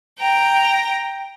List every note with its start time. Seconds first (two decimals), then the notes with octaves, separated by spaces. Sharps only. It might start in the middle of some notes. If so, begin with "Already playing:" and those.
0.18 G5 A#5